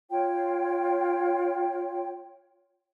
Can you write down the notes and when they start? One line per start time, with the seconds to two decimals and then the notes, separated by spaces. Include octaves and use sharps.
0.10 F4 C#5 G5